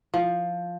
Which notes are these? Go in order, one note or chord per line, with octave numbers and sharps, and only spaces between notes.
F3